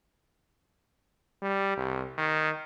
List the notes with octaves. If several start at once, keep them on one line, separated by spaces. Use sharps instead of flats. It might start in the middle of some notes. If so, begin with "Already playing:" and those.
G3
C2
D#3